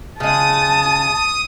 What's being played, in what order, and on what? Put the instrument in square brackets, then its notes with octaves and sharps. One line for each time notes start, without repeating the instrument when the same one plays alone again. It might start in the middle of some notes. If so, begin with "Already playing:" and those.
[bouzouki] C#3 G#3 [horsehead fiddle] A5 [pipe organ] D#6